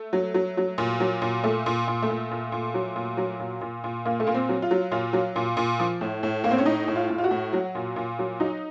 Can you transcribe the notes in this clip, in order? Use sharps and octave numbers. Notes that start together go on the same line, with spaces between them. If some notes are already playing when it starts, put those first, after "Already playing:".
Already playing: A3
F#3
F#3
F#3
A#2
F#3
A#2
A#2 A3
A#2
A#2
A3
A#2
A#2
A#2
F#3
A#2
F#3
A#2
A#2
A#2
A#2 A#3
A3
A#2 A#3
C4
F#3
F4
F#3
A#2 F4
F#3
A#2
A#2
F3
A2
A2
A2 A#3
C4
C#4
A2 D#4
A2
F4
A2
F4
F#4
A2
F#3
A#2
A#2
F#3
F#3 D#4